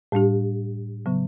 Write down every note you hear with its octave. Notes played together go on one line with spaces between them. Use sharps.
A2 G3 D4 G4
C#3 F#3 B3